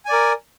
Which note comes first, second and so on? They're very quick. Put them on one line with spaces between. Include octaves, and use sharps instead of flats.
G#5 D5 A#4